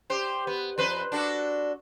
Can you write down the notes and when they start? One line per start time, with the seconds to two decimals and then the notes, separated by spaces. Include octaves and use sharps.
0.10 G4 C5
0.47 B3
0.78 F2 B4 C5
1.12 D4 F#4 A4